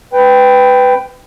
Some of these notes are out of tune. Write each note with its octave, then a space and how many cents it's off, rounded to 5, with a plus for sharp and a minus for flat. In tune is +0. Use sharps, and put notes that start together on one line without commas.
B4 +15 G5 +0